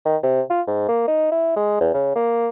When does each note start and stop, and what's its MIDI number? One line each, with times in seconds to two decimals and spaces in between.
0.05 0.17 51
0.23 0.42 48
0.50 0.62 65
0.67 0.85 44
0.89 1.06 58
1.08 1.28 63
1.31 1.54 64
1.56 1.77 56
1.81 1.89 40
1.94 2.12 49
2.15 2.49 58